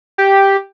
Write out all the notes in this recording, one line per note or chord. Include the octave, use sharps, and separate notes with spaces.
G4